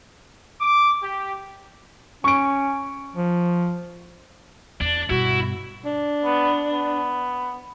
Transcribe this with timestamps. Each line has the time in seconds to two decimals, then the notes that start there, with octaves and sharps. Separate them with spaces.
0.60 D6
1.02 G4
2.24 C#4 C#6 D7
3.15 F3
4.81 E2 D4
5.10 G2 B2 E4 F#4
5.85 D4
6.25 B3
6.73 B3